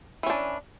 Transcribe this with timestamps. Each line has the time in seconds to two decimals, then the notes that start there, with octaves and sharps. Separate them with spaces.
0.23 E3
0.26 C#4
0.30 D4